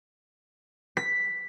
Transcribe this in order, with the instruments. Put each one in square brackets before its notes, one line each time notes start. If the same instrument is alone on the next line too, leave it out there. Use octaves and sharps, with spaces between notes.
[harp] B6